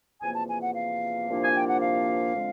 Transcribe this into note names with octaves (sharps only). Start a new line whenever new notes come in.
E2 C3 F3 A#3 G#5
A5
G#5
F#5
F5
C2 A#2 F3 A#3 D4
G#5
G5
F#5
F5
D3 F3 G#3 C4